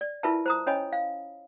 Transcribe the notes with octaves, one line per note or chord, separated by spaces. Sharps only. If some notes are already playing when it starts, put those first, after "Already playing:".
D5
E4 F4 A#4 B4 E5 A5
C5 A#5 D#6
C#4 C#5 D#5 G#5 B5
F5